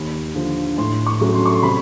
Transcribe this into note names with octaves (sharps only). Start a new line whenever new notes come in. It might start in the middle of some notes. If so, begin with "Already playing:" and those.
Already playing: D#2 B5
D3 F3
A2 C6
C#6
F#3 A3 C#4
C6
C#6
C6
C3 B5